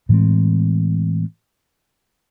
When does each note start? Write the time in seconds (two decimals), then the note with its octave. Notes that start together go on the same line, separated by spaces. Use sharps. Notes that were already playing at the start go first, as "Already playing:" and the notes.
0.09 A2 E3 G#3 C4